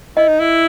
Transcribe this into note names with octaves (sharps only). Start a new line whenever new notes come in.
E4 D#5
D#4
E4